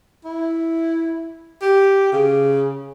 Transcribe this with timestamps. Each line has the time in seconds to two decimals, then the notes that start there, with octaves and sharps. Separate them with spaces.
0.25 E4
1.62 G4
2.12 C#3